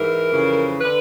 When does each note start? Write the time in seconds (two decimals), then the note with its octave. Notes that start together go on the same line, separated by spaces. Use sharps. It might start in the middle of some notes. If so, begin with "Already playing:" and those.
Already playing: G#2 E3 A#4
0.31 F2 C#3 E3
0.81 D3 B4